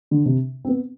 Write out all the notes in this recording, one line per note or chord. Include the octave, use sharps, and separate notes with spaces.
D3
C3
C4
B3